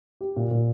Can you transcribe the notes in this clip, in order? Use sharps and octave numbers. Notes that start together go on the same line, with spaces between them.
G4
A#2
A#2